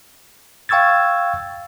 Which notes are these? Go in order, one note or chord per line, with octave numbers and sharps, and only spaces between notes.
F5 G5 C#6 E6 G#6 A6